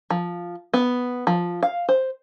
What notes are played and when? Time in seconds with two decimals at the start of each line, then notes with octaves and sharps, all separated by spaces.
0.10 F3
0.74 B3
1.27 F3
1.63 F5
1.89 C5